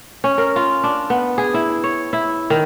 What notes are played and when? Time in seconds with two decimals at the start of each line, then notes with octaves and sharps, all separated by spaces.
0.24 C#4
0.38 A#4
0.56 F4
0.84 D4
1.10 B3
1.38 G#4
1.54 E4
1.84 C#5
2.13 E4
2.50 D#3